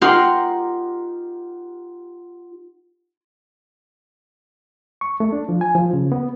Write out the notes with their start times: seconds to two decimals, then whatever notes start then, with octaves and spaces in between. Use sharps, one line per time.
0.01 D#4 F4 G4 A#4 F#5 C6
5.01 C#6
5.20 A3
5.32 D4
5.49 F3
5.61 G#5
5.75 F3
5.94 C#3
6.12 B3